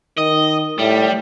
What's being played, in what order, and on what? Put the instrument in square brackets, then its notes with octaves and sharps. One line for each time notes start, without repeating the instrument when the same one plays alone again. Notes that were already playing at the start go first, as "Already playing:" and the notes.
[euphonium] D#3 [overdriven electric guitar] D#5
[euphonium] A2 [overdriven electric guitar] G3